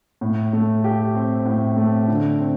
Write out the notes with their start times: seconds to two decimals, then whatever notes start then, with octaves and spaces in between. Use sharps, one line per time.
0.21 A2
0.53 A3
0.84 G4
1.15 C4
1.46 A2
1.77 A3
2.08 D3
2.39 C4